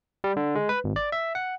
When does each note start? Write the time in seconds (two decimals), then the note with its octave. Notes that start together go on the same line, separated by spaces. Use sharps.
0.24 G3
0.37 D3
0.55 G#3
0.69 B4
0.84 G#1
0.96 D5
1.12 E5
1.35 F#5